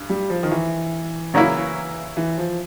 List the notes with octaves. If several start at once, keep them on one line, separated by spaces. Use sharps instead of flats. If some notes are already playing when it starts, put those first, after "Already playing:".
Already playing: G2
G3
F3
D#3
E3
C#3 F#3 A#3 C#4 E4
E3
F3